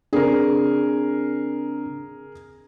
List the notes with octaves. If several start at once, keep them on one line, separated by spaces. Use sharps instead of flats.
C#3 C4 D4 G#4 A#4